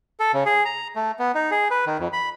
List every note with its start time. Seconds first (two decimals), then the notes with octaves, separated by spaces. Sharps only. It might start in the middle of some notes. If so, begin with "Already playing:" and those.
0.20 A4
0.34 C#3
0.46 G#4
0.65 A#5
0.96 A3
1.19 B3
1.35 D#4
1.51 G#4
1.71 B4
1.86 D#3
1.99 F2
2.13 B5